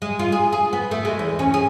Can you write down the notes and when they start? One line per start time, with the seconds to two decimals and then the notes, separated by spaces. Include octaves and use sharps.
0.02 G#3
0.19 F4
0.32 G#4
0.53 G#4
0.73 B3
0.91 A3
1.05 G#3
1.19 E2
1.39 C#4
1.54 G#4